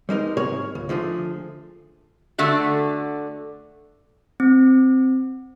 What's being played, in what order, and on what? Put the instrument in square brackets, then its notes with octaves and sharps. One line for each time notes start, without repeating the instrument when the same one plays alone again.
[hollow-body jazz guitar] G3 G#3 D#4 A#4
G#2 C3 G#4 A#4 C#5
C#2
D3 F3 A3 G#4
[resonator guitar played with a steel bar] D3 A3 F#4
[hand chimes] C4